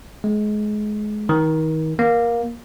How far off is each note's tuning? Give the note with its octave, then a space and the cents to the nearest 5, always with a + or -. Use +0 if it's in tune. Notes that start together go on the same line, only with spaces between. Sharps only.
G#3 +25
D#3 +30
A#3 +15